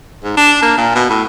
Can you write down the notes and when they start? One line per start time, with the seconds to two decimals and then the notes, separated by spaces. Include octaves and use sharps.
0.24 G#2
0.37 D4
0.62 A#3
0.78 A#2
0.95 B2
1.10 A2